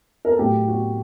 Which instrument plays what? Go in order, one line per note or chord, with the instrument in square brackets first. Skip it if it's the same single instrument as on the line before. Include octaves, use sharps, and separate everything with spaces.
[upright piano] A#4
A4
A2 F#3 G4
F#4